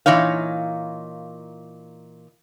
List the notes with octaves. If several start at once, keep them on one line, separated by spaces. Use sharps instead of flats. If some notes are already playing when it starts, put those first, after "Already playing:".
A#2 E3 D#4 C#5 F5